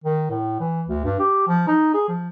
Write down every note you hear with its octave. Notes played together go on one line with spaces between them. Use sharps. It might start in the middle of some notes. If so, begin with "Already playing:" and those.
D#3
A2
E3
D2
G2
G4
F3
D#4
G#4
F3